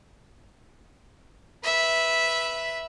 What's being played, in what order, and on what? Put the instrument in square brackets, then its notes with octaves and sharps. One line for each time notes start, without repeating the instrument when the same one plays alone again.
[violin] B4 E5